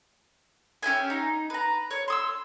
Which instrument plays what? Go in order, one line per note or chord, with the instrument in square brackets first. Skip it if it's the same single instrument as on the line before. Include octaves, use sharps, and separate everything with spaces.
[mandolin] C#4 G4 E5 G#5
D#4
B4 A#5
C#5
C6 D#6 E6